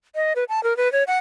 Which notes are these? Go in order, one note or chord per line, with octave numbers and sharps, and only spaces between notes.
D#5
B4
A5
A#4
B4
C#5
F#5